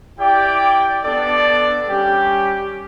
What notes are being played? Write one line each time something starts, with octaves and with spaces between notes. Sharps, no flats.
E4 G4 D5 G5
B3 D4 A4 D5
G3 C#4 G4